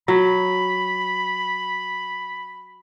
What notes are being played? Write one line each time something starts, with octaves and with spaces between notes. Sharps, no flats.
F#3 B5